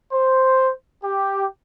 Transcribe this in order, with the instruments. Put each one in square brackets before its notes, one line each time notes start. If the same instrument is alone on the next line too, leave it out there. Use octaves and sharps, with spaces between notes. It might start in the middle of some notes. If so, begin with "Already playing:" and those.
[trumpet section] C5
G4